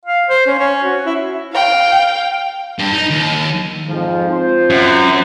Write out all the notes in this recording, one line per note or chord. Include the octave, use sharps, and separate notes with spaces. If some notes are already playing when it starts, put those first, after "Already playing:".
F5
C5
C#4
C#4
F#4
E4
F5 G5
G2
D#4
D#2
F2 G#2 F3
C4 F4 C5
F#2